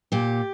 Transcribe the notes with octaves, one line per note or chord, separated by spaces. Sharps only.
A#2 G4